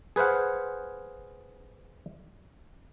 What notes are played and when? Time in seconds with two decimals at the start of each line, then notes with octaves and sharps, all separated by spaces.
0.16 G#4 B4 C5 F5 F#5